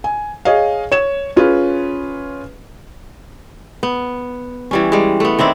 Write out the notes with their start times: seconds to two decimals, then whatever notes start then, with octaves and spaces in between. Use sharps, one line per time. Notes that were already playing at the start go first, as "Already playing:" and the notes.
0.04 G#5
0.45 G#4 C#5 D#5 F5
0.92 C#5 E7
1.36 C#4 F4 G#4 B4
3.83 B3
4.71 E3 G3 C#4
4.92 G3 G#3
5.20 A3 B3
5.39 D#3 C4 D4 E4